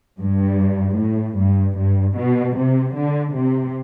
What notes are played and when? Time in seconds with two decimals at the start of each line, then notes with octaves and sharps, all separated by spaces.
0.20 G2
0.98 A2
1.37 G2
1.78 G2
2.17 B2
2.56 C3
2.95 D3
3.35 C3